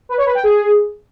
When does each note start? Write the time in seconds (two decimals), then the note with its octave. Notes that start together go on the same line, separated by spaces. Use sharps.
0.09 B4
0.18 C#5
0.26 B4
0.35 G5
0.44 G#4